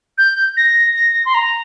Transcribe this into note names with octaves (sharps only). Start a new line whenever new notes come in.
G6
A#6
A#6
C6
A#5